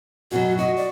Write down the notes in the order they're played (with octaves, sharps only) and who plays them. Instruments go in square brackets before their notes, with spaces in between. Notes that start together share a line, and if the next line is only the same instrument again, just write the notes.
[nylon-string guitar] F#2 B2 F#3 [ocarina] F#4
[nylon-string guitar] F#4 [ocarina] D#5
[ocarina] D5